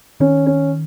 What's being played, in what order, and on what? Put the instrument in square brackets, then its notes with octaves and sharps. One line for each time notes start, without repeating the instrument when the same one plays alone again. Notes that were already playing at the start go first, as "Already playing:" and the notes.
[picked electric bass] D#3 [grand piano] C#4
[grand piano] C#4